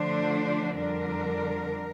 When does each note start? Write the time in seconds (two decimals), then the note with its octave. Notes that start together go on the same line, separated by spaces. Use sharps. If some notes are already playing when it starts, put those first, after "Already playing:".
Already playing: D3 F3 A3 D4 C5
0.78 F2 D3 G3 D4 A#4